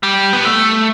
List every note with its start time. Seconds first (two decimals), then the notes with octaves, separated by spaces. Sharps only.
0.03 G3
0.33 B3
0.45 A3